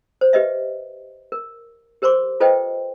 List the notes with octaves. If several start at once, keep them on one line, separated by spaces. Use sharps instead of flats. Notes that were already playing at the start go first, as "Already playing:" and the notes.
C5
G4 B4 D#5 E5
A#4
G4 A#4 C5 C6 D6
F4 A4 B4 C5 D#5 G5